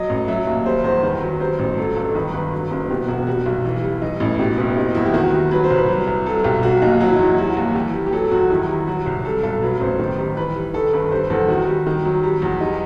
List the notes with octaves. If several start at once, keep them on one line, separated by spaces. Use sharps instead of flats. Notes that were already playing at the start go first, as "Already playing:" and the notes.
Already playing: F#3 D#5
A1
F#3 E5
D#2
G3 C5
E2 C5
D#3 B4
F#3
G3 C5
A1
F#3 A4
G1 A4
D#3 B4
G1 B4
F#3
F#1
B2 G4
E1 F#4
G3 F#4
B1
E3
G3
E3 D#4
A1 E4
B2 G4
F#1 E4
G3 D#4
E2 E4
G4
D#3 F#4
G3
F#3 B4
C5
C2
B4
F#3
C2
F#3 A4
B1 G4
F#3 F#4
D#2 D#4
F#3 F#4
E4
D#4
E2 E4
G3 F#4
D#2
E3 G4
G3
G4
F#3 A4
E2 F#4
D#3 E4
G3
F#3 F#4
C2
G3 A4
B1 A4
F#3 B4
A1 C5
D#3
G3
E3 B4
G3
D#3 A4
G1 B4
G3 C5
E2 A4
D#3 F#4
G3
D#3
F#3
G3
E2
G3 D#4